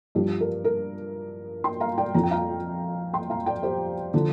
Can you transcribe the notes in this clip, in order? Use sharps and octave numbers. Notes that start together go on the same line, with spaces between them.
G2 F3 G4
A#4
A#4
G5 C6
F5 A#5
D5 G5
F2 F3 A#5
G5
F5 A#5
G5 C6
F5 A#5
D5 G5
G4 C5
D3 F3